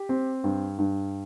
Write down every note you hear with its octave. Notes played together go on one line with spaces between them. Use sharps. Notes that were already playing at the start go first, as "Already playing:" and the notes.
Already playing: G4
C4
G2
G2